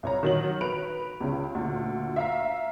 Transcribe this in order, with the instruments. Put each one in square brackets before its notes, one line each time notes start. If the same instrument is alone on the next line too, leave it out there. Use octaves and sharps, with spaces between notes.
[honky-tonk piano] C2 C#5 A#5
D#3 F#3 F#7
B4 D7 F7
C#2 C#3
D2 A#2
E5 F5 A#5